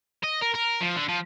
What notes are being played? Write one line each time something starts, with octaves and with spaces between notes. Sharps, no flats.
D#5
A#4
A#4
F3
D3
F3